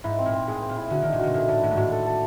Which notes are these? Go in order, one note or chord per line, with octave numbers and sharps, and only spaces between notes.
G#2 E4
C4
A#2
C4
A2 G#4
C4
A#2
E4
D3 F#4
D#3 D4
A#2
B2 F#4
A#2 A3
A2 D4
A2 F#4
G#2
A2 F#4
A4
A4